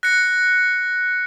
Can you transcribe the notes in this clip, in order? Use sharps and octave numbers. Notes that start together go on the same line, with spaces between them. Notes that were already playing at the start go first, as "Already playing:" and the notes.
F#6 A#6 C#7